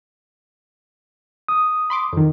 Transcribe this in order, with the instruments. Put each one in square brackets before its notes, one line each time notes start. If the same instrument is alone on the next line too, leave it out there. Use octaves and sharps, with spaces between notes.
[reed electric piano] D#6
[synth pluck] B5 C6 D6
F2 D#3